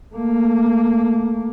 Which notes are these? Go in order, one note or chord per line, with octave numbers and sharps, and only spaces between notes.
A3 A#3